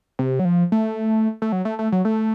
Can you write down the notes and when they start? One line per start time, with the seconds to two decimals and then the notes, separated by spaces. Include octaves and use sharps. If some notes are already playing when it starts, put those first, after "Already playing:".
0.19 C3
0.39 F#3
0.45 F3
0.72 A3
1.42 A3
1.52 F#3
1.65 A3
1.79 A3
1.92 F#3
2.05 A3